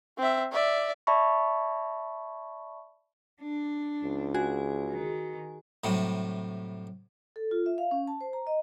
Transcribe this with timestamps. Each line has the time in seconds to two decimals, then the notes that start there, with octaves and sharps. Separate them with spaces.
0.19 C4 E5
0.53 D5 E5
1.07 D5 E5 A5 B5 C#6
3.41 D4
4.03 C#2
4.34 F#4 G#4 G#5
4.90 D#3
5.84 A2 C3 F#3 G3
7.36 A4
7.51 F4
7.66 E5
7.78 F5
7.91 C#4
8.08 A5
8.21 C5
8.33 A#5
8.47 D#5